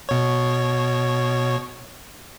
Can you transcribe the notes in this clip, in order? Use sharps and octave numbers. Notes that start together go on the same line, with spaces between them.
B2 C#5